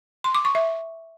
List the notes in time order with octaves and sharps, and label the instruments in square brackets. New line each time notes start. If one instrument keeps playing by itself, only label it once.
[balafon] C6
D6
C#6
E5